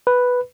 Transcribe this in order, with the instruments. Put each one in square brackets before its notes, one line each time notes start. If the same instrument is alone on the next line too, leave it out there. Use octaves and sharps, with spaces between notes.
[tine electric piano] B4